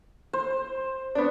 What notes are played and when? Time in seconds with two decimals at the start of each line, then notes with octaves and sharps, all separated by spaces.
0.33 C5
1.15 B3 D4